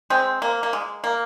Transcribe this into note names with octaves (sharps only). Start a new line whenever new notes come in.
G#3 C4
A#3
A#3
G#3
A#3